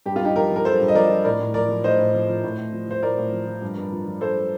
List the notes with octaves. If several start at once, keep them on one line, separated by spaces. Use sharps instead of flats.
G2 G4
F4
G2 D#4 G4
F3 G4 A#4
F3
A#4
G2 A4 C5
G2
D#5
F3 A#4 D5
F3
A2 A#4 D5
A2
F3 A#4 D5
F3
A2 C5 D#5
A2
F3
F3
A2
A2
F3
F3 C5
A2 A#4 D5
A2
F3
F3
G2
G2
F3
F3
G2 A4 C5